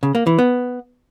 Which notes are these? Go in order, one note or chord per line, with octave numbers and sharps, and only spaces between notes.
C#3
A#3
E3
B3